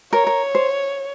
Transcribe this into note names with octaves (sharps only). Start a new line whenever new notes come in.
A#4 C#5
A#4
C5